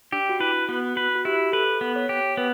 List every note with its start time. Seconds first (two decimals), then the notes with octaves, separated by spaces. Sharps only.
0.12 D4 G4
0.29 F#4
0.40 E4 B4
0.69 B3 F#4
0.96 F#4 B4
1.15 F#4
1.25 E4 G4
1.52 A4 B4
1.81 B3
1.96 C#5
2.09 G4
2.37 B3 B4